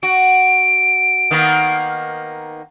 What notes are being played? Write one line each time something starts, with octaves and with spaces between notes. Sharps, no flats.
F#4 D7
D#3 A#3 B3